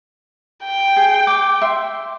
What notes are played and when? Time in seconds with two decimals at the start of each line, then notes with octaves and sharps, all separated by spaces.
0.64 G5
0.96 G#4
1.27 D6
1.61 E5 C6